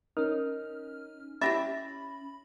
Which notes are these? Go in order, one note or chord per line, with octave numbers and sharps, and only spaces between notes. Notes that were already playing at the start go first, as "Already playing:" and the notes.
C#4 D#4 A#4 F6
C#4 E4 G4 E5 B5 A6 A#6